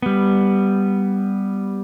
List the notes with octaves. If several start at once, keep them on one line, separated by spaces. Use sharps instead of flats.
G3 B3